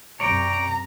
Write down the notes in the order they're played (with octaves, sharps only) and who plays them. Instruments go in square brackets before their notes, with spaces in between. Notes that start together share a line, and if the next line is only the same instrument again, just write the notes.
[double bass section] F#2 C3 [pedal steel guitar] C#5 D5 G5 [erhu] A#5